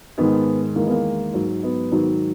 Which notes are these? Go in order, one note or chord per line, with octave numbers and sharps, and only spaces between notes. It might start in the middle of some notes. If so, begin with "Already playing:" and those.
G#2 D#3 G#3 B3
E2 D#3 G#3 A#3
B3
A#3
G#2 F#3
B3
G#2 D#3 F#3